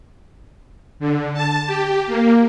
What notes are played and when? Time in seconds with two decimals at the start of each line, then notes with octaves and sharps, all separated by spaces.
1.00 D3
1.34 A5
1.67 G4
2.07 A#3